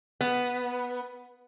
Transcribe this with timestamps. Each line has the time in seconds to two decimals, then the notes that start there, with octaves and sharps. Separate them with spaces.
0.21 B3